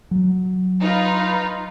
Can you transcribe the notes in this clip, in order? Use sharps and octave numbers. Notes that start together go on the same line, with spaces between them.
F#3
D#4 F4 B4